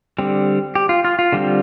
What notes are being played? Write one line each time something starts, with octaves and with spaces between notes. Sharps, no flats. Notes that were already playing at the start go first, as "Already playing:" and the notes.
D3 G3 C4
G4
F4
F4
F4
D3 G3 C4